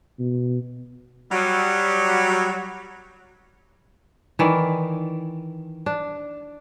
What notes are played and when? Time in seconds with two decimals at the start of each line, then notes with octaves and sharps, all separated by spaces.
0.19 B2
1.32 F#3 G3
4.39 D#3 E3 D5
5.86 D4